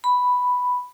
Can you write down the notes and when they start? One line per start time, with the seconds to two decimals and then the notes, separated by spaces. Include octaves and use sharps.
0.04 B5